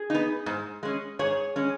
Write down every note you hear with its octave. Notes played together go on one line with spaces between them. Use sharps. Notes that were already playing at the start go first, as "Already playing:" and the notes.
Already playing: G#4
B3 D#4
G#2
G#3 C#4
G#2 G#4 C#5
G#3 C#4